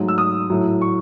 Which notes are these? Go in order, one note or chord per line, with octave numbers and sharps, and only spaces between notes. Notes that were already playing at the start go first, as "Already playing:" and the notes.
Already playing: G#2 F#3 A3
E6
D#6
A2 F#3 A3
C#6